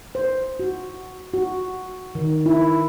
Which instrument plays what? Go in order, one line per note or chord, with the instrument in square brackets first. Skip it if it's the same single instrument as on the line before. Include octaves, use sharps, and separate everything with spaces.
[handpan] C5
F#4
F#4
D#3
E4